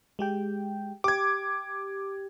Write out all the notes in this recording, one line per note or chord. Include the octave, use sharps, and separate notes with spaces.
G#3 G4 G5
G4 D6 G#6